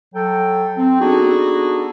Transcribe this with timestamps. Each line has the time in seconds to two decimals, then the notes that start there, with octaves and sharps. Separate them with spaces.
0.14 F#3 A4 G5
0.77 C4
1.00 B3 D4 D#4 F#4 G#4 A4